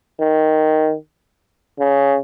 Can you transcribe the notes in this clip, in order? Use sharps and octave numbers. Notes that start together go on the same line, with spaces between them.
D#3
C#3